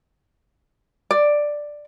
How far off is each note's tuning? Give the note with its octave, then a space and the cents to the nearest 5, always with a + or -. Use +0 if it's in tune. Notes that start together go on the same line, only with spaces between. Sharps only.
D5 +5